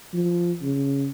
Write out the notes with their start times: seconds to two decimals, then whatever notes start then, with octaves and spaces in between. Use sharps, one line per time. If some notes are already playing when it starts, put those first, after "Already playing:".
0.13 F3
0.62 C#3